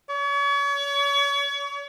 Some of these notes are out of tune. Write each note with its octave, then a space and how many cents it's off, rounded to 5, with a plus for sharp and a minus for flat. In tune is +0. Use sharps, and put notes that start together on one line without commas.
C#5 +35